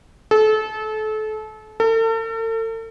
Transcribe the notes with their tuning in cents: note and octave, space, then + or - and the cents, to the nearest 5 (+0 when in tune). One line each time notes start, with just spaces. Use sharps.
A4 -30
A4 +40